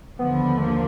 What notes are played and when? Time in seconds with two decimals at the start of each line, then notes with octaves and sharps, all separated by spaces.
0.19 D#2 D3 F3 B3
0.58 A3
0.62 A#3